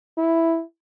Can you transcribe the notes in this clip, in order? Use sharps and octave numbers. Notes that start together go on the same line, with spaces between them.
E4